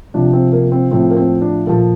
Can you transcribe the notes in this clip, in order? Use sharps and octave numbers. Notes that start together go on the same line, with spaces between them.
C3 F3 D4
C4
A#3
C4
A2 F3 C4
A#3
C4
D4
A#2 F3 A4